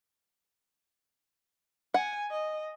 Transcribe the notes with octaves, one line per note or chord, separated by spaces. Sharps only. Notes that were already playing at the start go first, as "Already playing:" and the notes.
F#5 G#5
D#5